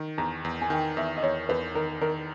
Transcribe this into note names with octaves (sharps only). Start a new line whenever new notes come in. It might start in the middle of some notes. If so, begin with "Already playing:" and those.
Already playing: D#3
E2 A#5
E2
G#5
D#3 G5
E2 E5
D#5
E2 C#5
E2 B4
D#3 A#4
D#3 A#4